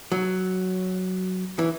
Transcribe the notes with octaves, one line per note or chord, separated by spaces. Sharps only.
F#3
E3